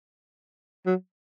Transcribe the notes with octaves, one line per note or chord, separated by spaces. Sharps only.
F#3